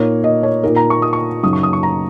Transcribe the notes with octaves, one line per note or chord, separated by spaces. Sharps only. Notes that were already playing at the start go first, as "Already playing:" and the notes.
Already playing: A#2 A#3 D#4 C#5
D#5
C#5
A#2 A#3 D#4 A#4
A#5
C#6
D#6
C#6
F#2 C#3 F#3 D#4 D#6
C#6
D#6
C#6
A#5